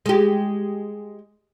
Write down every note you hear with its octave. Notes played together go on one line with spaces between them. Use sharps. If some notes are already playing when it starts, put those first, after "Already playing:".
G#3 G4